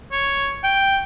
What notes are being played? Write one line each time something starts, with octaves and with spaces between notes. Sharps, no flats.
C#5
G5